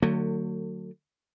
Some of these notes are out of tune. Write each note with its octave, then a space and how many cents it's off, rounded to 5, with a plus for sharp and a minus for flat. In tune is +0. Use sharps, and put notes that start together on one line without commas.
D3 +30 F#3 +0 A3 +45